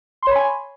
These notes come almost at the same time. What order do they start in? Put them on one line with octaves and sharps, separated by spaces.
C6 C#5 B5 G#5